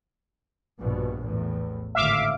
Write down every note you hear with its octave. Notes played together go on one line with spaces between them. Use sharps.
A#1 G2 B2
E2 A2
G#1 A2 D3 E5 F5 D6